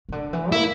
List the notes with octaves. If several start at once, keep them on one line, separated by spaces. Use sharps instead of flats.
C#3
D3
E3
A#3 E4